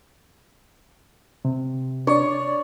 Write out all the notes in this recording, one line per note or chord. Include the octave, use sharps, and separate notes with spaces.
C3
D4 C#5 D5